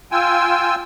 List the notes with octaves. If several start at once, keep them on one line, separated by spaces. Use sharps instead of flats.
F4 G5 G#5 E6